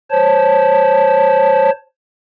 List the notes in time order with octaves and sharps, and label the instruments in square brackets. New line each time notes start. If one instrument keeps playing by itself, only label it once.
[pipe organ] C5 C#5 A5